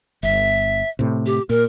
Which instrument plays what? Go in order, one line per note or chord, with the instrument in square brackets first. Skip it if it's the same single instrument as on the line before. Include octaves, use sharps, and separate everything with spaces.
[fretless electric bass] G1 [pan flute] E5
[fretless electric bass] A2 C3
[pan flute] G4
[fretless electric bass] A#2 [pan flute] A#4